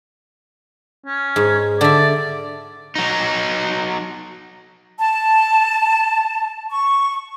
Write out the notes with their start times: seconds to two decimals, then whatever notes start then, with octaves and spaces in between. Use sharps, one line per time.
1.06 C#4
1.36 G#2
1.81 D3 D5 E5
2.96 F#3 D#4
4.99 A5
6.70 C#6